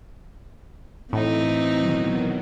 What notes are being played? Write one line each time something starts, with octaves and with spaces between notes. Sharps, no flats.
A2 E3 C4 D#4
B2 D#3 F#3